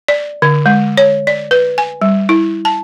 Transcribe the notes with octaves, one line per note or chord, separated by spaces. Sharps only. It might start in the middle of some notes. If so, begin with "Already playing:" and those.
D5
D3
G#3
C#5
D5
B4
G#5
G3
E4
A5